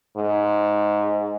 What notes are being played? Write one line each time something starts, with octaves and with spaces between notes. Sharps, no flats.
G#2